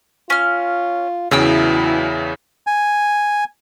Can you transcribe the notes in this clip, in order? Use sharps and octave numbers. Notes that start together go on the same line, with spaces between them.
C#4 F4 F6
E2 C#3 F#3 E4 B4 G5 D#6 E6
G#5